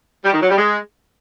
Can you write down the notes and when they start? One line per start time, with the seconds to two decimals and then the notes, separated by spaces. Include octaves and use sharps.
0.25 G3
0.33 D#3
0.42 F#3
0.50 G3
0.58 G#3